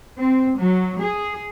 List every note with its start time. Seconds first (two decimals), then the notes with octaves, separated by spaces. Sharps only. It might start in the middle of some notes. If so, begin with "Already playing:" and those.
0.17 C4
0.58 F#3
1.00 G#4